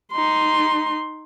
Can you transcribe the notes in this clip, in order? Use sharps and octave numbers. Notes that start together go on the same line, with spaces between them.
D#4 C6